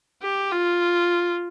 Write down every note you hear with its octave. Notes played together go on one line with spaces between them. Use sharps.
G4
F4